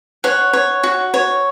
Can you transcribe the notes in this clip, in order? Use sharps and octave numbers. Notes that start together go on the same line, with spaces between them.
C#5 F#5
C#5
F#4
C#5